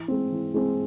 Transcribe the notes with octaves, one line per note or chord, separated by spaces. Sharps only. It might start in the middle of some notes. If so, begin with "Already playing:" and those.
Already playing: E3
G#3 C4
E3
G#3 C4